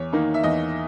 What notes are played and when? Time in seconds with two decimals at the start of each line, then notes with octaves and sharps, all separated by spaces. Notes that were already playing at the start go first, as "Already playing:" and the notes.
Already playing: E2 C#5
0.13 D#3 A#3 D#4
0.34 E5
0.43 E2 D#5